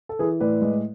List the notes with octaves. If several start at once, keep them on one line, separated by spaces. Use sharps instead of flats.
A4
E3 G#4 B4
A2 B4 D5
G#3